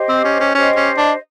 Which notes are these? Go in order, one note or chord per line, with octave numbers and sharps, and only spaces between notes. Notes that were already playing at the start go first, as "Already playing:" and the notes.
Already playing: G4 C5 D#5
C4
C#4
C#4
C#4 G4 C5 D#5
C#4
D4